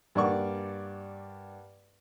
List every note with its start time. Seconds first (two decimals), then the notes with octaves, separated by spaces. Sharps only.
0.15 G2 A#3 D5 F#5 C#6